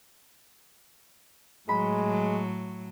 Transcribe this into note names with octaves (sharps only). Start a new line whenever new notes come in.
A2 F#3 G#3 B5